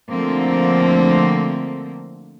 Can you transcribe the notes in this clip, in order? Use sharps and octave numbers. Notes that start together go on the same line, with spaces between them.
D3 F3 A3 A#3 C4